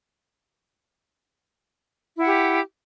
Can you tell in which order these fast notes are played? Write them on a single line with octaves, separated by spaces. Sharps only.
E4 F#5 G4